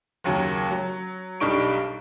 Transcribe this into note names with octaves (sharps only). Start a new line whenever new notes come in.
F#1 D#2 F#3
F#3
B1 G2 G3 D#4 C#6 D7